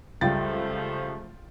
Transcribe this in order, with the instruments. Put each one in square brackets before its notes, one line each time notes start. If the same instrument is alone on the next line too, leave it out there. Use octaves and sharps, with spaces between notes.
[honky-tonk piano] C#2 G3 [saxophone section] F3 A3 [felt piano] F4 G5 A6